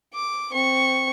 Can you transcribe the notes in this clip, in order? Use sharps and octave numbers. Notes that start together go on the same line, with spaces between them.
D6
C4 C#6